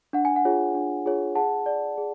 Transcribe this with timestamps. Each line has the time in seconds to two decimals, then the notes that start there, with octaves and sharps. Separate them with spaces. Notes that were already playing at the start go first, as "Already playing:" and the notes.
0.13 D4 F#5
0.25 G#5
0.36 F#5
0.45 F4 G#4 C#5
0.75 D4
1.06 F4 G#4 C#5
1.35 G#4 F#5 A5
1.66 D5
1.98 G#4